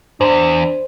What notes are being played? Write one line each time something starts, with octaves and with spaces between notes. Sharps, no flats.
E2 G#2 D4 C5